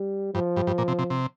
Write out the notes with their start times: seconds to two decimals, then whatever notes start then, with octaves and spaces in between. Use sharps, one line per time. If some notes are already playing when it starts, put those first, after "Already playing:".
Already playing: G3
0.34 G2 F3
0.56 G2
0.67 G2
0.78 A#2
0.88 C3
0.99 C3
1.10 C3